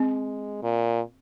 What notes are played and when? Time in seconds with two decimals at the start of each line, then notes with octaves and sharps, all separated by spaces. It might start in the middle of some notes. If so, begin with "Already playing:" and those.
Already playing: G#3 C4
0.63 A#2